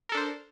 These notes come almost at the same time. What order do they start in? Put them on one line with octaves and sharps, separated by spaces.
A#4 A4 D4 C5